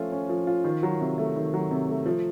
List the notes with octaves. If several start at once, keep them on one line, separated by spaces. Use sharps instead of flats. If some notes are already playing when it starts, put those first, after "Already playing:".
Already playing: F3 A3 C#4 F4
C#4
F3
F4
D#3
F#3
C3
A3
D#3
F#3
C3
A3
F3